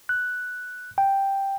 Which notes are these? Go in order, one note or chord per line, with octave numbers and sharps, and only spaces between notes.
F#6
G5